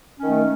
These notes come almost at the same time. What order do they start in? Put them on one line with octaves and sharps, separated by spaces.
C#4 D#3 A3